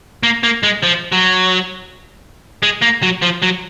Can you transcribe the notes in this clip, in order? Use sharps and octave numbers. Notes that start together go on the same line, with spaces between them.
A#3
A#3
G#3
F3
F#3
G#3
A#3
F#3
F3
F#3